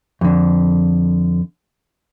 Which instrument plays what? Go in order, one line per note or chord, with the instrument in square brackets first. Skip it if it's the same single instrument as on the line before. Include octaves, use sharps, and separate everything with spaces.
[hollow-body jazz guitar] F2 D3